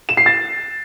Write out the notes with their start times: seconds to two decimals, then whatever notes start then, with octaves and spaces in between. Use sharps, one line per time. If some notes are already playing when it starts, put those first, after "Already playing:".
0.09 E7
0.17 C7
0.26 A6